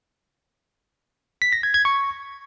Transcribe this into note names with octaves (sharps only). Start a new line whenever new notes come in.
B6
A#6
G#6
G#6
C#6